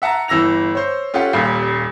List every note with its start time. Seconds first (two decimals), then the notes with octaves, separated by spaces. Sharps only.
0.02 E5 F#5 A5 A#5
0.28 G1 E3 E6 A#6 F7
0.75 C5 C#5
1.14 C#4 F4 G4 A4 F#5
1.33 D#1 D#2 A#2 G3 G4 F5